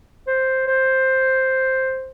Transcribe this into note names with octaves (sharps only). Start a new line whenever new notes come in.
C5
C5